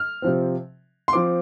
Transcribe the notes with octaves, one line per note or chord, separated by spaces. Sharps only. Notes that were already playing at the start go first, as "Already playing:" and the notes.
Already playing: F6
C3 F3 C4
C6
F3 C4 D6